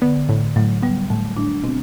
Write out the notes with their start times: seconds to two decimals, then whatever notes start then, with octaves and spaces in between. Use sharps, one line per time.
0.02 D3 B3
0.29 A2
0.56 A2 F#3
0.83 G3 B3
1.10 A2 A3
1.37 A2 D4
1.63 B2 C4